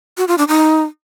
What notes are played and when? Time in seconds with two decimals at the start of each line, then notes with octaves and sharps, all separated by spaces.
0.18 F#4
0.28 F4
0.38 D4
0.48 D#4